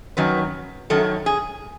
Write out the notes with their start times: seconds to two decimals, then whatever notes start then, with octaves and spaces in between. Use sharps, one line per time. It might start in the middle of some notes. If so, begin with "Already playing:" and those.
0.17 F#2 D#3 F#3 B4
0.90 F#2 D#3 F#3 A4
1.26 G#4